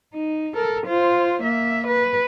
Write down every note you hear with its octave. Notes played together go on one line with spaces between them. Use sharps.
D#4
A4 A#4
F4 C5
A#3 E5
B4